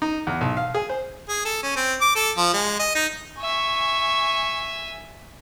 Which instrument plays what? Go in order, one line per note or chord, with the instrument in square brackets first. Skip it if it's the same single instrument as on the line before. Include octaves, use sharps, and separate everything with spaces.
[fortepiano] D#4
E2
B1
F5
G#4
C5
[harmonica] G#4
A4
C#4
C4
D6
A4
F3
G#3
D#5
D#4
[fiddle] E5 G#5 [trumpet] C#6